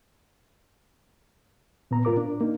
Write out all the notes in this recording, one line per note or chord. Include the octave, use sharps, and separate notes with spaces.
A#2 B3 A#5
A2 F4 A#4 D6
D4
A#3 D#4